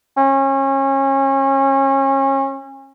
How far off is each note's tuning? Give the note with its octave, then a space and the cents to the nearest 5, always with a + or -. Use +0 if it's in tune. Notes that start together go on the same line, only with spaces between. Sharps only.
C#4 -30